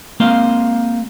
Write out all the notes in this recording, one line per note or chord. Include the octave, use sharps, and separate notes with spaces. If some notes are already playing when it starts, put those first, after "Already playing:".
G#3 A#3 C4 C5 D#5 F5